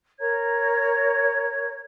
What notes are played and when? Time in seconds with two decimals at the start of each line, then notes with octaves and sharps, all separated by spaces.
0.20 A#4 C#5 A#5 G#6